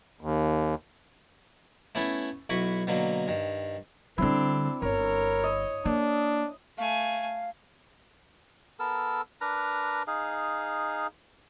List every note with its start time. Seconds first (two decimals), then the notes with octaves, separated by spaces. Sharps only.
0.21 D#2
1.95 A3 B3 C#4 E4 A4
2.50 B1 E4 F#4 B4 C#6
2.87 B2 D3 F#3 A#3
3.28 G2 D#3
4.18 D3 G3 C4 D4 E4
4.82 G1 A#4 C#5
5.44 D#5
5.85 A#3 D4
6.78 A3 F5 G#5
8.79 B3 A4 A#4 E6
9.41 D4 A#4 B4 A#5
10.07 D#4 G#4 F5